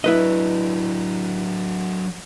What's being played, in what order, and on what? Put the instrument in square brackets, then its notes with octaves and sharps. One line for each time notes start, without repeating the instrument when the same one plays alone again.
[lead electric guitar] F#3 D4 [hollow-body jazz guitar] E4 B4 D#5